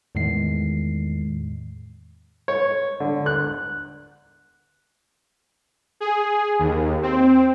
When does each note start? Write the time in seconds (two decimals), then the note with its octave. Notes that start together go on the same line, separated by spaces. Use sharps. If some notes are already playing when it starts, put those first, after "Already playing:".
0.15 E2 A2 D#3 G#3 C7
2.48 C#5
3.00 D3
3.26 F#6
6.00 G#4
6.59 D#2
7.03 C4